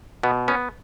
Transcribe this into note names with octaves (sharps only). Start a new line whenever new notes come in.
B2 B3
B3 C#4